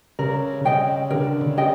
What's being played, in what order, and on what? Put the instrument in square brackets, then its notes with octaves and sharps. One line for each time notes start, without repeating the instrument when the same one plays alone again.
[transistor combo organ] C#3 [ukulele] A#4
[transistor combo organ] C#3 [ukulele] D#5 G5
[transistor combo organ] D3 [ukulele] A#4
[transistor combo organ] C#3
[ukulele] D#5 G5